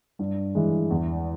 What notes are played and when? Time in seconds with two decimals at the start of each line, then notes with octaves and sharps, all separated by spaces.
0.19 G2
0.55 E3 G#3
0.90 E2